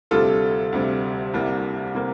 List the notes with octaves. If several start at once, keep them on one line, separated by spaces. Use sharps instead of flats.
D2 C3 G3 F4 A4
D2 C3 G3
C2 C3 G3 A#3
C3 G3 A#3